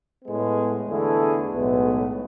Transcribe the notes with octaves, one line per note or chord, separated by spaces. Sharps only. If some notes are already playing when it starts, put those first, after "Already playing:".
A2 G#3 B3
E2 D3 A3 E4 G#4
B1 A2 G#3 B3